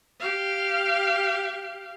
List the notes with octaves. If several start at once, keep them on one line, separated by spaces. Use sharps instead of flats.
G4 F5